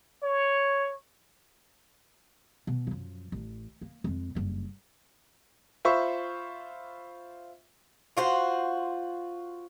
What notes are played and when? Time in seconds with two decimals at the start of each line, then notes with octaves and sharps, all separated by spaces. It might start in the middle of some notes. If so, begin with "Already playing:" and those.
0.23 C#5
2.67 B2
2.87 F#2 F3
3.32 A1
3.81 A#3
4.04 F2 G#3
4.35 F#1 G2
5.85 F4 C5 E5 B5 C#6
8.17 F4 F#4 C5